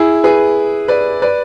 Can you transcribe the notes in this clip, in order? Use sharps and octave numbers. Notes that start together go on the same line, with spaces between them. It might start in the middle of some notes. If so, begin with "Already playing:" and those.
Already playing: E4 G#4
G#4 B4
B4 D5
B4 D5